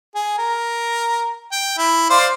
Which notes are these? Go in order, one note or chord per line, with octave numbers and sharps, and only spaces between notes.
G#4
A#4
G5
E4
C5 D5 F5